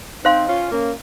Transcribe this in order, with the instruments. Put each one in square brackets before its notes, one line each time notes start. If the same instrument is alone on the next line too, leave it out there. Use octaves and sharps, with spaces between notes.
[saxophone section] C4 D#4 [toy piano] C5 F5 C6
[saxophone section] C#4 F4
A#3 C#4